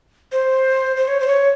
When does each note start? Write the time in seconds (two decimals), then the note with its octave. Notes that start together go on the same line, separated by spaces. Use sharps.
0.32 C5
0.96 C5
1.08 C#5
1.20 C5
1.28 C#5